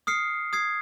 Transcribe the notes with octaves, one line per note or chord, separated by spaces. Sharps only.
D#6 F6 C7 C#7
D#6 G#6 C7